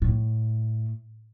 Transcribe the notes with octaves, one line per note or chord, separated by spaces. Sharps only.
A2